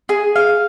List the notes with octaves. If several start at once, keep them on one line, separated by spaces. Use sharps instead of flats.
G#4
F5